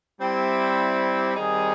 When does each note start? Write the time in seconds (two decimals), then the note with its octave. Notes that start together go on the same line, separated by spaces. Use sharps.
0.19 G3 C4 E4
1.36 D#3 G3 C4 D#4 G#4